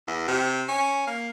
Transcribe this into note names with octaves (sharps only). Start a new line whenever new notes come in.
E2
C3
C#4
A#3